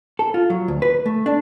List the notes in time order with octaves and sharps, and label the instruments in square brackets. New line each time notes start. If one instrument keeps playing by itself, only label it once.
[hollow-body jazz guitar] A4
F4
F#3
D2
B4
A3
D4